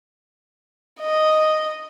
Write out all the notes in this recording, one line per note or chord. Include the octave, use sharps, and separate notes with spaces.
D#5